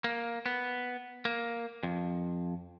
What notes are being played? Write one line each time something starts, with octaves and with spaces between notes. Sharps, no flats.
A#3
B3
A#3
F2